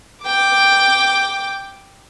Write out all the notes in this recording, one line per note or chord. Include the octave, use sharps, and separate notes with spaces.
G5 D6